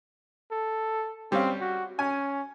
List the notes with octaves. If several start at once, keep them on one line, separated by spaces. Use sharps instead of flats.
A4
G3 C4 C#4 F5
F#4
C#4 G#5